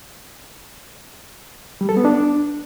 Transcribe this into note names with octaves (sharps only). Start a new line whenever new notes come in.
G3
A4
B3
D4